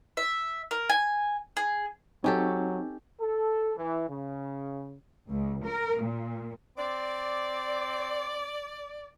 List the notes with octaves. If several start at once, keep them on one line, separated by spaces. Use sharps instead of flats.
E5
A#4
G#5
G#4
F#3 C4 C#4 D#4 G4 A4
A4
E3
C#3
C#2
A#4
A#2
C4 D5